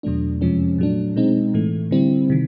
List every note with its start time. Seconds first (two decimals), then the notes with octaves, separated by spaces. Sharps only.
0.03 E2 B2 F#3 A3 D4
0.41 F2 C3 F3 G#3 C#4
0.78 A#2 F#3 A3 D4
1.16 B2 G#3 C4 D#4
1.54 A2 E3 A3
1.91 D3 G3 C4 E4
2.30 C3 D#3